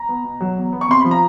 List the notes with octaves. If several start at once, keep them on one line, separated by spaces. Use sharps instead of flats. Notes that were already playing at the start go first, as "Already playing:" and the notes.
Already playing: A#5
B3
B2
F#3
E2
B3
C#6
C3 C6
F3 B5
A#5